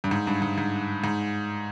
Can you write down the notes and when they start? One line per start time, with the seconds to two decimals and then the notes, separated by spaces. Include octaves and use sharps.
0.04 G2
0.11 G#2
0.27 G2
0.42 G#2
0.58 G#2
1.04 G#2